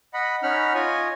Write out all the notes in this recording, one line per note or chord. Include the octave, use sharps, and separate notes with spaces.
D#5 F#5 B5
C#4 D#4 F#5 B5 F6
F4 C#5 D#5 G#5